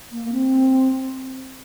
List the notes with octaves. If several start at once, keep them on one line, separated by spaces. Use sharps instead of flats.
A#3
C4